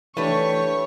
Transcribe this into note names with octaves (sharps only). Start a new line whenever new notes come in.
E3 A3 D4 G4 B4 C#5 C#6